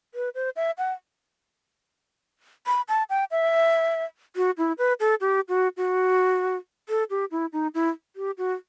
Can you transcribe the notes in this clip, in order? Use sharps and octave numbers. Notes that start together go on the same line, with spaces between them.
B4
C5
E5
F#5
B5
A5
G5
E5
F#4
E4
B4
A4
G4
F#4
F#4
A4
G4
E4
D#4
E4
G4
F#4